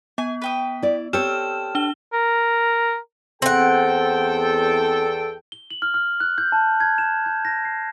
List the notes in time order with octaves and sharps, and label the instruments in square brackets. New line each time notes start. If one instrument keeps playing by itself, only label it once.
[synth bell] B3 [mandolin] G#5
[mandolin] B4 G5 D#6
[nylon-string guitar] E4 D5
[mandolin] C4 A4 E6 [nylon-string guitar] G4 C#5 [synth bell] F6 E7
[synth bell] D4 G7
[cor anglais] A#4
[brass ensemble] E2 A4 G5 [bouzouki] C4 F#5
[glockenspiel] G7
F#7
F6
F6
F#6
G6
A5
G#6
E7
G6
A#6
C7